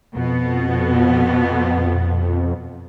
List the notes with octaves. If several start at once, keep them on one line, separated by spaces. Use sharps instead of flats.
F2 B2 B3